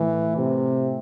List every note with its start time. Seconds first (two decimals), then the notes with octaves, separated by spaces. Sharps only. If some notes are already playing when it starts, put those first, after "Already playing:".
Already playing: A2 E3
0.37 C3